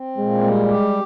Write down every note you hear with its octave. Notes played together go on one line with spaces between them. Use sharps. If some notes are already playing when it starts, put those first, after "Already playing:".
Already playing: C4
A#2 G#3
G3
G4